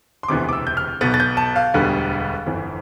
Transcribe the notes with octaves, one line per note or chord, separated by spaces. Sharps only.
C6
E1 D2 C3 E3 B3 D6
D6
E6
G6
F6
B1 B2 B3 A6
A6
G6
A5
F5
E1 D2 D3 G3 B3
G1 F2 E3